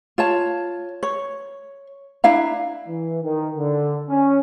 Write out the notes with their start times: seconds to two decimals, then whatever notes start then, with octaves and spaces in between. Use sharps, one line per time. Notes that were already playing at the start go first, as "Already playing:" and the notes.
0.18 F4 C#5 A5
1.03 C#5
2.24 D4 E4 F5 A#5
2.88 E3
3.22 D#3
3.56 D3
4.09 C#4